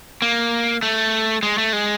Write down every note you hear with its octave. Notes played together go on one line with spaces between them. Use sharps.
A#3
A3
G#3
A3
G#3